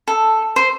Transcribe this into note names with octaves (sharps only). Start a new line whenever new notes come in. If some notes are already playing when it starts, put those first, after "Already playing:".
A4
C5